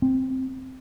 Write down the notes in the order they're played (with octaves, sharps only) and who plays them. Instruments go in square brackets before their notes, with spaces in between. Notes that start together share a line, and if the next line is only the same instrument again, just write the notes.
[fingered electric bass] C4